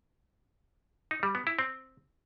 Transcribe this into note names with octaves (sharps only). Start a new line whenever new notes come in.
D#4
G3
B3
E4
C4